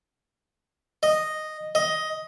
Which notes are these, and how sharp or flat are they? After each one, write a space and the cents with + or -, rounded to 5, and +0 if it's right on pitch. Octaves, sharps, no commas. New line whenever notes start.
D#5 -5
D#5 +10